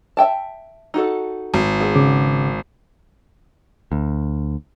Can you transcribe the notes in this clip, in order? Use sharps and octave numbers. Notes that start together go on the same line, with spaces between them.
E5 G5 A5
D#4 F#4 A4
G#1
B3 G#4
C#3 D6
D2